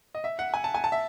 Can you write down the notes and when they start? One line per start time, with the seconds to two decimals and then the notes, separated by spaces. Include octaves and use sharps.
0.15 D#5
0.24 E5
0.39 F#5
0.54 G#5
0.64 A5
0.74 G#5
0.84 A5
0.92 E5